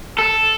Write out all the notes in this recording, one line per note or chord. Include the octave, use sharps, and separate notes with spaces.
A4